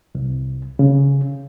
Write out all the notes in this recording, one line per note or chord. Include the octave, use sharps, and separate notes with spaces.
C2
C#3